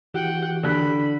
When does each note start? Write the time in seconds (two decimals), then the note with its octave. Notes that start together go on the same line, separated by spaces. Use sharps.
0.14 E3 F#4 G4 F#5 G5
0.63 D3 B5 F#6